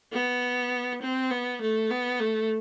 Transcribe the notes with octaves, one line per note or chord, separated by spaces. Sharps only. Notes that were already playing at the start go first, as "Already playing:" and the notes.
B3
C4
B3
A3
B3
A3